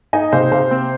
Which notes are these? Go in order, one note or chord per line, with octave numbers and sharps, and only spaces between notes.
D#4 D#5 G#5
C3 C5 F5
C3 C5 F5
C4